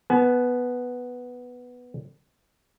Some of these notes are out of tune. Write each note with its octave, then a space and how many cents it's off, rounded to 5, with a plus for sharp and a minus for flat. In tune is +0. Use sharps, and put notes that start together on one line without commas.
B3 +0 G#5 +45